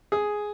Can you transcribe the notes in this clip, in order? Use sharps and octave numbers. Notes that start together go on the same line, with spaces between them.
G#4